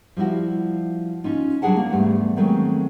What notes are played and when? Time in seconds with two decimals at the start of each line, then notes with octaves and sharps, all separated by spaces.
0.17 F3 G3 E4 F#4
1.24 C#4 D#4 F4
1.62 F#3 G3 D4 G#4 F#5 A5
1.77 A#3
1.90 E2 G#2 G3 A3
2.37 D#3 F#3 G#3 A3 C4